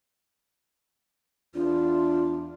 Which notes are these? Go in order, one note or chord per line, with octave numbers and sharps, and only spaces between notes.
E2 D4 F4